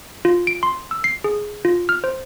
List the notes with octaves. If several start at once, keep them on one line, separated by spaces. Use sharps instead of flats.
F4
D7
C6
E6
C7
G#4
F4
F6
C5